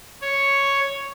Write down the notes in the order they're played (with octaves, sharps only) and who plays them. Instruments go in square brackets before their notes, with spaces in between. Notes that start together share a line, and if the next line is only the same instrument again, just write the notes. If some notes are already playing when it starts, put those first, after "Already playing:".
[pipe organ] C#5